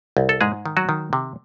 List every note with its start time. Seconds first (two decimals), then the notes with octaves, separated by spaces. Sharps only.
0.17 C2
0.29 A4
0.41 G#2 G#3 G#4
0.66 D#3
0.77 F#3 F#4
0.89 D#3
1.13 C3